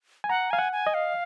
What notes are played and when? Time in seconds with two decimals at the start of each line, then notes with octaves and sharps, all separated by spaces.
0.24 G#5
0.29 F#5 A#5
0.51 F5 G#5
0.59 F#5
0.72 G#5
0.87 D#5
0.94 F5